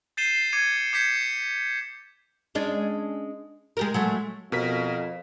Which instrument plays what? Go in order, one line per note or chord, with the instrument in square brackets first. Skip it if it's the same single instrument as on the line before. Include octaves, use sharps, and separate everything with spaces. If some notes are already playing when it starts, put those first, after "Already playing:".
[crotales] G6 A6 C7 D#7 E7 G7
D6 G#6 C#7 D#7
D6 G6 G#6 B6 C#7
[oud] G#3 C#4 D4
G#3 G4 A#4
F#3 G#3 A3
[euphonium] F2 [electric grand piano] B2 A#4 B6